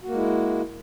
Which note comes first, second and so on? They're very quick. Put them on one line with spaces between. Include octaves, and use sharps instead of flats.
F#4 A#3 G#3 E4